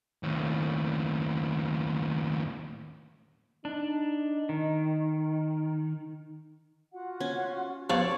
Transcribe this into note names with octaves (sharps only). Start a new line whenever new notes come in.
D#2 A2
D4 D#4
D#3
F4 F#4 F#5
C#4
F3 B3 C#5 D5